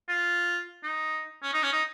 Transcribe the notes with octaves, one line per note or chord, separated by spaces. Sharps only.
F4
D#4
C#4
D#4
C#4
D#4